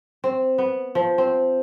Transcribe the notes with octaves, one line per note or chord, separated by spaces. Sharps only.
C4
B3
F3
C4